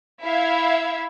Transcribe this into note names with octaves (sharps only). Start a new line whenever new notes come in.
E4 E5 F5 G#6